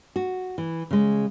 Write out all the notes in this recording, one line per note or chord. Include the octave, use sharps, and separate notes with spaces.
F#4
E3
C#3 G#3